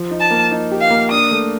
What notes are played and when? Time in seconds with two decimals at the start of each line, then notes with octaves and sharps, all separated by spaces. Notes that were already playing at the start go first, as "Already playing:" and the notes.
Already playing: F3
0.11 D#4
0.20 A5
0.31 A#3
0.52 D#4
0.71 G4
0.81 F5
0.90 A#3
1.11 D4 D#6
1.31 A3